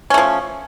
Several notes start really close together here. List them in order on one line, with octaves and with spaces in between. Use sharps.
C#4 A3 F3